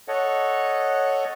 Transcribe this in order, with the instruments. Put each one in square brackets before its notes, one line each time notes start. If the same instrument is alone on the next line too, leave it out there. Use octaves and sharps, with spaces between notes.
[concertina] A4 C#5 D#5 F#5